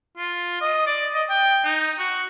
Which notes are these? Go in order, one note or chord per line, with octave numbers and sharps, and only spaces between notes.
F4
D#5
D5
D#5
G5
D#4
F#4